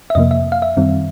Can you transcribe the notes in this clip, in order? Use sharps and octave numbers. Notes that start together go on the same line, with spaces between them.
E5
F2 C3 F3 A#3 D#5
E5
F5
E5
F#2 D#3 G3 C4